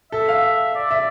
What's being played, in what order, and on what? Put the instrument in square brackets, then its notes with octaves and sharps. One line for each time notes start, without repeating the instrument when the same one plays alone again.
[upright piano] A4 [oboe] E5
[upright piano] F5
[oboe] D5
[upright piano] E5